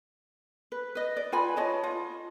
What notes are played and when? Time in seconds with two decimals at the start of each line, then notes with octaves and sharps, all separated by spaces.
0.72 B4
0.95 B4 D#5
1.16 D5
1.32 F4 B4 G#5 B5
1.56 C#5 D#5 A5
1.84 F4